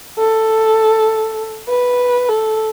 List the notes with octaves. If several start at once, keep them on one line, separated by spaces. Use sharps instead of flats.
A4
B4
A4